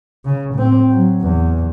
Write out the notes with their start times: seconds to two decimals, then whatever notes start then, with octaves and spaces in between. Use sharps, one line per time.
0.25 C#3
0.54 A2 C4
0.91 F#3
1.22 E2